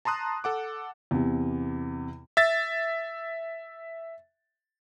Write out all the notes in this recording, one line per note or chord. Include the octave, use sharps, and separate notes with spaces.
A5 A#5 C6 D#6 F#6
A4 F#5 D6
E2 C3
E5 A6